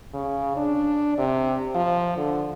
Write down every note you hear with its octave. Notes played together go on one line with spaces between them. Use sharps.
C#3
D4
C3
F3
D3